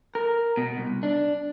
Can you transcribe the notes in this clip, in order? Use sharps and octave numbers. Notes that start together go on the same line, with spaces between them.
A#4
B2
C2
D4